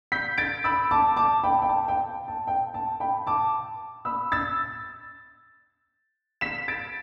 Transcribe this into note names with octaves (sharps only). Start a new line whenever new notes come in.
G6 B6
A6 D7
B5 E6
A5 D6
A5 D6
G5 B5
G5
A5
G5
A5
G5
A5
G5 B5
A5 D6
B5 E6
E6 A6
B6 E7
A6 D7